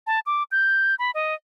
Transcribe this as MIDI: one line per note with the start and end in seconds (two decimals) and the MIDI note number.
0.07 0.20 81
0.26 0.43 86
0.52 0.95 91
0.99 1.11 83
1.14 1.34 75